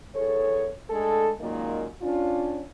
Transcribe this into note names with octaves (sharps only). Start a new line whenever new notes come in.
E2 E4 G#4 A4 C#5
G#3 A3 D4 A4
F#2 A#2 D#3 G#3 A#3
C#4 D4 F4